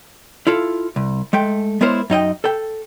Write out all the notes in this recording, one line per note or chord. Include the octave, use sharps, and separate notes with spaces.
E4 F4 A4
C2
G#3 A3 G5
G#3 B3 E4 A#4 C5 C#5
F#2 D#4 D#5 G5
A4 G5